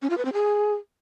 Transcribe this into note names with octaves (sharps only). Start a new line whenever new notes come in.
C#4
F4
B4
C4
G#4